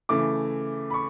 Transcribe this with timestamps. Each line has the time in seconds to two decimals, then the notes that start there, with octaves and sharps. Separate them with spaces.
0.09 C#3 E3 A3 D6
0.90 B5
0.94 C#6